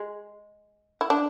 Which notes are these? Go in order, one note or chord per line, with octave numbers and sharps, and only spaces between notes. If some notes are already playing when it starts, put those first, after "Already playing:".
Already playing: G#3
E4
D4